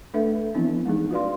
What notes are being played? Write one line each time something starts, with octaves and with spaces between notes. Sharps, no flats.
A3 D4 A4 B4 E5
E3 F3 B3 C4 D4 E4
G#3 A#3 D#4 G#4
F4 F#4 B4 D5 F5 C6